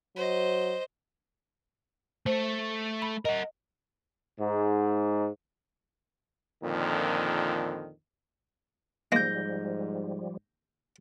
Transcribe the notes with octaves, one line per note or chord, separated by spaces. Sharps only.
F#3 C5 D#5
A3 A4 C5
B5
A#4 D#5 F#5
G#2
F2 A#2 D3 D#3
G#2 F3 G3 G#3 A#3 G6 A#6